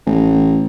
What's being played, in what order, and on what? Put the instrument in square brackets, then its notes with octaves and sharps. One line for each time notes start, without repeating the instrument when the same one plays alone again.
[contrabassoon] A1